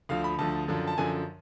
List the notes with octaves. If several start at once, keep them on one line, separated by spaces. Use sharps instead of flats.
D2 D3 F3 F5
B5
D2 D3 F3 A5
F#2 D3 F3
A5
F#2 D3 F3 G#5